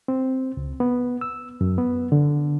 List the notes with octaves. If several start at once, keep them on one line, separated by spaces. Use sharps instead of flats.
C4
C#2
B3
E6
F#2
B3
D3